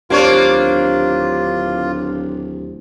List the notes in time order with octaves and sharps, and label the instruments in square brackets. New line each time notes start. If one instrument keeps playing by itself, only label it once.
[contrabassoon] D1 [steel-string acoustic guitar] D#2 G4 C5 [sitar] A#3 D4 C#5 [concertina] F4